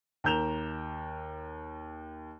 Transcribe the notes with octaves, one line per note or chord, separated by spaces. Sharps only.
D#2 A#4 A#5 G6 E7 F7